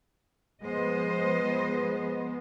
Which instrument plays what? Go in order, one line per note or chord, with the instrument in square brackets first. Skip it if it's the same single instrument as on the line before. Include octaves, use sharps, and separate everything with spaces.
[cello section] F3 C5 D#5 [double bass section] G#3 B3